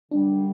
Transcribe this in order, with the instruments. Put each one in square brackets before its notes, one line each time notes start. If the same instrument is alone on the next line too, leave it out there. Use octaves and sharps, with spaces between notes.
[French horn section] F#2 D3 G3 [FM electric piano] D4